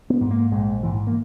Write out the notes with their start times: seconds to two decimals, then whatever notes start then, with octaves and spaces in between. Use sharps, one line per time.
0.10 B3
0.21 G#2
0.31 A#3
0.51 A#1 G#3
0.83 G#2 E3
1.07 A#3